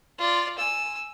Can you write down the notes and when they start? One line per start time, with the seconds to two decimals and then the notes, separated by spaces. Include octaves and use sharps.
0.19 F4 D5
0.59 G#5 E6